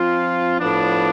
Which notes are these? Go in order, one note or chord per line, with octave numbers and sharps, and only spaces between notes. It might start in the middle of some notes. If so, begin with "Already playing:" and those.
Already playing: F3 C4 F4
A2 F3 B3 D4